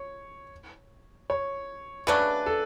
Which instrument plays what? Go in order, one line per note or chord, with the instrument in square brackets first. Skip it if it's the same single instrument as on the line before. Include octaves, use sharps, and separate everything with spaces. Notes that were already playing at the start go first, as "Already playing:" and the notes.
Already playing: [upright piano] C#5
C#5
[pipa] C#3 F#3 A3 D4 [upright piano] B4
[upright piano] A4